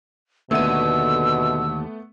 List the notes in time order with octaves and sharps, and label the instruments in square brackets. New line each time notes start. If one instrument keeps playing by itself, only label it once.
[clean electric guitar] D#2 D3 [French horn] B2 [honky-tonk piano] A3 B3 D#7 [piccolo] E6